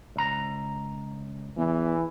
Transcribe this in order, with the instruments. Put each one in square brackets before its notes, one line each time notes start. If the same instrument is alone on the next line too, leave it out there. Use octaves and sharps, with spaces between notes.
[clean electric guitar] C#2 A#5
[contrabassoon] E2 [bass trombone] E3